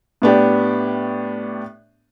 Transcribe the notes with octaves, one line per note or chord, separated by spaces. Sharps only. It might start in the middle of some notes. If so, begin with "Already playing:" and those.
A2 B3 D4 G4